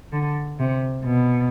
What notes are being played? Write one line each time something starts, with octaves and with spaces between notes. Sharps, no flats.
D3
C3
B2